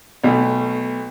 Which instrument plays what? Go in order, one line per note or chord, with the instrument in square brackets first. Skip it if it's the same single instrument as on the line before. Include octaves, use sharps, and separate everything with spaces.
[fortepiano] B1 B2 A3